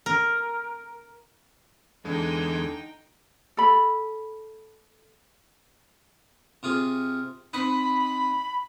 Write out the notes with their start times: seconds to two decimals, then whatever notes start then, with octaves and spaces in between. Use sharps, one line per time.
0.06 A#4
2.05 E2 D3 G#3 D#4 G#4 G5
3.57 A4 B5
6.63 C3 F4 G#4
7.53 C4 D#4 B5